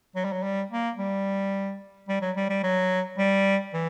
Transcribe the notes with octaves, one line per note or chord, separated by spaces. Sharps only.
F#3
G3
F#3
G3
A#3
G3
G3
F#3
G3
G3
F#3
G3
E3